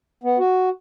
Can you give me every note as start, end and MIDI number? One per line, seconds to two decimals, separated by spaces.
0.24 0.38 59
0.39 0.69 66